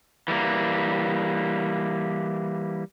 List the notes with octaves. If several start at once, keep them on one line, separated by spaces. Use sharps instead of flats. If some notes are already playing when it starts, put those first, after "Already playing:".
E3 G3 A3 A#3